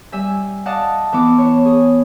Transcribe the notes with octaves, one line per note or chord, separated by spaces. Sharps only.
G3 E5 G#5
D5 D#5 F5 F#5 A5
E3 B3 D6
E4 C#5
G#4